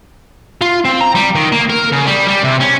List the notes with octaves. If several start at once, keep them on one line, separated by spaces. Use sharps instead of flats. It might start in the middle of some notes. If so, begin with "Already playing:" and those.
F4
C4
A#5
G3
D#3
A#3
A#4
C#3
G3
G3
C3
C#4